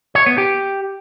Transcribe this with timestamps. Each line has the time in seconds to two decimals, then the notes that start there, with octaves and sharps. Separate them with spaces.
0.15 C#5
0.26 B3
0.38 G4